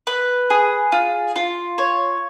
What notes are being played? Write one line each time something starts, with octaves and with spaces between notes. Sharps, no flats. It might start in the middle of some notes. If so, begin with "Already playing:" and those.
B4
G#4
F4
F4
C#5